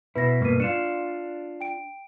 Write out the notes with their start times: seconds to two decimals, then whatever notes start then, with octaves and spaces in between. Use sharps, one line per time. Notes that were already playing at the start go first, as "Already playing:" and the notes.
0.16 B2 E4 B4 A#6
0.41 G2 B2 A#3 B4 B6 D#7
0.60 D4 F4 C#7 E7
1.61 G5 D7